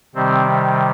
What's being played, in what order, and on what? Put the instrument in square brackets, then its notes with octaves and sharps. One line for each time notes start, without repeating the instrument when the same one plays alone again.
[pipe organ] C3 D#3 G3 C4